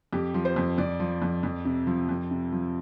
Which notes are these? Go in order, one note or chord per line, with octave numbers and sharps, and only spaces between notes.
F2 G4
F3
C5
F2
F2 D5
F3
F2
F2
C3
F3
F2
C3
F3